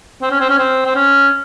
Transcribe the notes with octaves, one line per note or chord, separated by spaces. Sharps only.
C4
C#4
C4
C#4
C4
C4
C#4